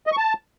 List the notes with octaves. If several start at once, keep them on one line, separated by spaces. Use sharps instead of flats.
D#5
C#6
A5